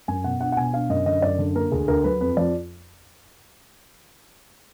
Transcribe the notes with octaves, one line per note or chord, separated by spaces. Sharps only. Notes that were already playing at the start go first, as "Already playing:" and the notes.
F#2 G#5
B2 F#5
D4 F#5
F#5
B2 G#5
D4 F5
F#2 D#5
D3 D#5
F#2 D5
D3
A#3 A#4
D2 G#4
D2 A#4
F#3 B4
F2 B4
F3 D5